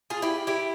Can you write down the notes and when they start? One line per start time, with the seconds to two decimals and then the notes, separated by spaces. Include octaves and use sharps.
0.10 F4 G#4
0.22 E4 G4
0.47 E4 G4